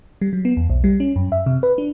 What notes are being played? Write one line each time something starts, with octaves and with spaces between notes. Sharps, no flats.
G3
F#3
B3
E2
B1
G3
C#4
F#2
E5
C3
B4
D4